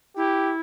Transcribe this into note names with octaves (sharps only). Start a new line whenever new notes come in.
E4 G4